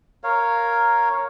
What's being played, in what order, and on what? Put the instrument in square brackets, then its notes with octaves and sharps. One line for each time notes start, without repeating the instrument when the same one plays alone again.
[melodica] A#4 C#5 F5